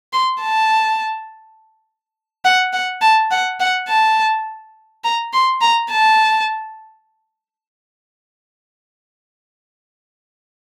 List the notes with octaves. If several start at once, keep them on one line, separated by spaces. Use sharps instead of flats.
C6
A5
F#5
F#5
A5
F#5
F#5
A5
A#5
C6
A#5
A5